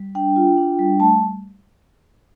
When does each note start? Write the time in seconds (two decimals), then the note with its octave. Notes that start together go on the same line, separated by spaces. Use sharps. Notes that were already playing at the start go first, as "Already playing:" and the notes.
Already playing: G3
0.15 D4 G5
0.36 F4
0.57 D4
0.79 G3
1.00 A3 A5